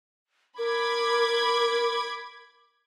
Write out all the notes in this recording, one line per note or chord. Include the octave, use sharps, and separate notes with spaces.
A#4 B5 D6 G#6